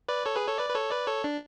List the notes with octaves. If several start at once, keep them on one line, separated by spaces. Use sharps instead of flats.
B4 D5
A4 C#5
G#4 B4
A4 C#5
B4 D5
B4
A4 C#5
B4 D5
A4 C#5
D4